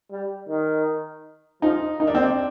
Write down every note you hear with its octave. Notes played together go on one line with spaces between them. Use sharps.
G3
D#3
F3 D#4
D#3 D#4
D4
C4
D4